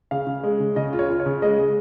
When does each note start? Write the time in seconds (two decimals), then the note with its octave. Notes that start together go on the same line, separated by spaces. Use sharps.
0.11 C#3 F5
0.27 C#3
0.43 G#3
0.60 C#3
0.76 C#3 D#5
0.93 F4
0.99 C#5
1.10 F4
1.20 C#5
1.26 C#3
1.42 G#3 D#5
1.59 G#3